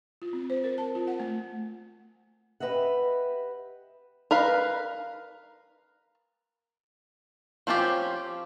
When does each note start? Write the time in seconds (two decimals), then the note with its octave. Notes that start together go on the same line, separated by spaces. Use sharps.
0.22 F4
0.33 C4
0.50 C5
0.64 A#4
0.78 A5
0.95 F4
1.07 F#5
1.20 A3
2.60 G4 B4 D#5 E5 F#5
4.31 A#4 B4 F5
7.67 F3 C4 C#4 F4 G4